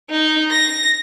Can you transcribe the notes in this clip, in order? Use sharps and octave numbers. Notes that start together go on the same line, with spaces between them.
D#4
A#6